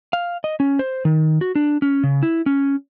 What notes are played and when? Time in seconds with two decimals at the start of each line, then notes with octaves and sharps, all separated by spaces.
0.13 F5
0.44 D#5
0.60 C#4
0.79 C5
1.05 D#3
1.41 F#4
1.55 D4
1.82 C#4
2.03 C#3
2.23 E4
2.46 C#4